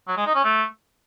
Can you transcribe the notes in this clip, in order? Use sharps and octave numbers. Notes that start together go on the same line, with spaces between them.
F#3
G#3
D#4
C#4
A3